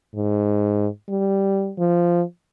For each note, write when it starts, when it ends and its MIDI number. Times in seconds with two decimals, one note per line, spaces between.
0.15 0.87 44
1.09 1.72 55
1.78 2.22 53